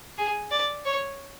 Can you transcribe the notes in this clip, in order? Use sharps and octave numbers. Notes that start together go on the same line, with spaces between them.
G#4
D5
C#5